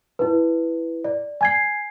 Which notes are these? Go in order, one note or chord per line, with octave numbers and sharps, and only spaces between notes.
E4 B4
D5
G#5 G#6 C7